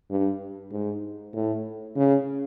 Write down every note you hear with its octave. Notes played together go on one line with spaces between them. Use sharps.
G2
G#2
A2
C#3